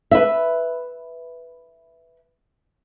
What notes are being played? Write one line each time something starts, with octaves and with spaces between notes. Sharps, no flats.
B4 E5